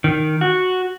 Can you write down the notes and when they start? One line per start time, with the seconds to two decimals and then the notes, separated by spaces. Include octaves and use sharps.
0.04 D#3
0.41 F#4